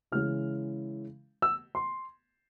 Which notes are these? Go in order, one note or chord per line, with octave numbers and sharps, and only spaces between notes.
C#3 E3 G#3 C#4 F6
E6
C6